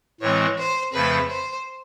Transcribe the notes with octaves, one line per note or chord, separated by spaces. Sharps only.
A2 E3 G#3 C4 C#5
C5
F2 C#3 F3 A3 B4
C5